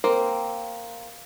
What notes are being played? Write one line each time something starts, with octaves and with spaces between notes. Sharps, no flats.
A#3 C4 C5